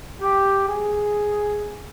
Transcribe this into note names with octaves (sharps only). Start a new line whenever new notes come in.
G4
G#4